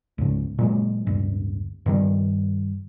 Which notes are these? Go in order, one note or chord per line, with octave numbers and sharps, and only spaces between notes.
C#2 G#2
A#2 F#3 G#3
D1 G2
G2 D#3 G3